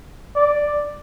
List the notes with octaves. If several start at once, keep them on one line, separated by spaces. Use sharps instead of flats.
D5